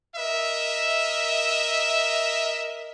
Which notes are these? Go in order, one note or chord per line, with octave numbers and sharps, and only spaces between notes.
A#4 D#5 E5